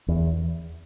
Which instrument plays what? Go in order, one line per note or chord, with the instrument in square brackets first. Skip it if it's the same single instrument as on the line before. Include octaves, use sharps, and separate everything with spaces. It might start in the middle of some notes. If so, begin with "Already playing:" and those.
[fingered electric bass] E2